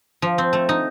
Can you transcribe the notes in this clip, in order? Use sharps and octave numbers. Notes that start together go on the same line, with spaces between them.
F3
C4
A3
D#4